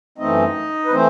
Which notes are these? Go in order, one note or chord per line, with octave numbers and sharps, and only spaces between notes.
F#2 E3 A3 C4 D#4 D#5
B4
E3 A3 C4 C5